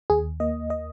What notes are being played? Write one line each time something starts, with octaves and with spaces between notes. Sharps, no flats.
D#2 G#4
A#3 D#5
D#5